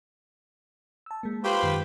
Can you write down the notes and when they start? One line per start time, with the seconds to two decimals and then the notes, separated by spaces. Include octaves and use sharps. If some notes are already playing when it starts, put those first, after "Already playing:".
1.06 A5 E6
1.23 G#3 A#3
1.44 F4 G4 B4 C5 C#6
1.63 F#2 D#3 G#3